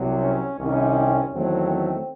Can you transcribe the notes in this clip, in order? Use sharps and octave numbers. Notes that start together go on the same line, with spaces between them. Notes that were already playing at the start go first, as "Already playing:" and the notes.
Already playing: C2 C3 F#3
C#4
C2 C3 D#3 C#4
E2 D#3 F#3 A3 C4
C4